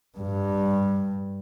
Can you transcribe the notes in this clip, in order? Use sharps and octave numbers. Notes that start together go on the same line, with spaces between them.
G2